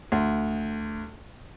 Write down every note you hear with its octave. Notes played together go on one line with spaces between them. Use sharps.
D2